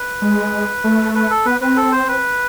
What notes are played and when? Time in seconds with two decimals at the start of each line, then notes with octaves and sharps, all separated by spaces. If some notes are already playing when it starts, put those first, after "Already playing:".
Already playing: B4
0.22 G#3
0.84 A3
1.15 B4
1.30 A4
1.45 B3 B4
1.61 C4 B4
1.76 A4
1.92 C5
2.08 B4